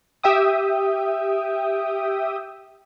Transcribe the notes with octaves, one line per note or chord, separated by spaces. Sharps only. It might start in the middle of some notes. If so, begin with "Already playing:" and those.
G4 E5 G5 D#6